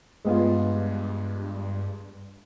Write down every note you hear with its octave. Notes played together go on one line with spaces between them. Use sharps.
G2 G#3 B3 F4